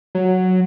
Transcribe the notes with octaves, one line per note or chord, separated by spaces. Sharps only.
F#3